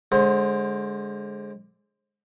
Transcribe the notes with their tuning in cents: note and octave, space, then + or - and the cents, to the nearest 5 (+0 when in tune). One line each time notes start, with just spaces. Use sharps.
D3 +0 G#3 +0 C5 +30